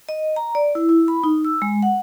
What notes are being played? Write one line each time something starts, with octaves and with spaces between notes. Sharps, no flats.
D#5
A#5
D5
E4
E4
B5
D#4
E6
G#3
F#5